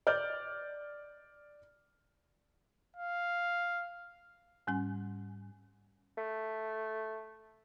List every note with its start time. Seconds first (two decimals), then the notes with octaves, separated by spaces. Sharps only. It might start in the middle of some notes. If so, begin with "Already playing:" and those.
0.07 D5 F6 G6
2.96 F5
4.67 G#2 G3 C#4 G#5
6.18 A3